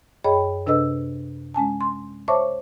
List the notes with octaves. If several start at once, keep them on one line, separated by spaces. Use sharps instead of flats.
F#2 G#4 C#5 D#5 G5 B5
C3 D4 A4 B4 D#5 E6
G#3 C#4 G#5 A5
C6
C5 C#5 E5 A5 C#6 D6